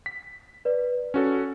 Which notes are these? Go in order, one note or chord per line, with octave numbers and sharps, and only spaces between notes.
B6
B4 D5
C#4 F#4 A4